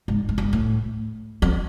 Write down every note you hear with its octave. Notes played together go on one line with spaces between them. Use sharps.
G#2
G#2
G2
A2
F2